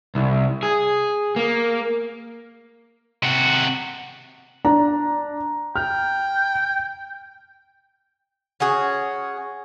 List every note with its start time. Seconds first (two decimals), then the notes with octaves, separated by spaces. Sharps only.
0.15 C2
0.63 G#4
1.36 A#3
3.23 C3 F#4
4.65 D4 A#5
5.76 G5 F6
8.60 C#4 F#4 G#4